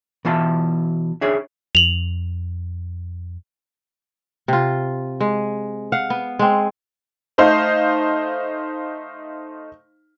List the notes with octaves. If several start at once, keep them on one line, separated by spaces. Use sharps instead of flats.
B2 E3 F4 E5 A5
D4 G#4 C#5 E5
F2 F7 F#7
C3 F4
G#3
F5 F#5
B3
G#3 C4
A3 D#4 C5 F5